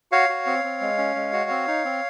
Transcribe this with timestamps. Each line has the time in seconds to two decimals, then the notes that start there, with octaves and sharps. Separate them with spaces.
0.12 F#4 C#5 F5
0.29 F#4
0.46 C4
0.64 C4
0.81 G#3
0.98 C#4
1.16 G#3
1.33 F#4
1.50 C4
1.67 D#4
1.85 C4